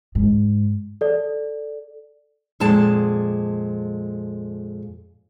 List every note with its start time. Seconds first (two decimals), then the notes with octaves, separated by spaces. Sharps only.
0.15 G#2
1.01 A4 D5
2.60 F2 A#2 G#3 A5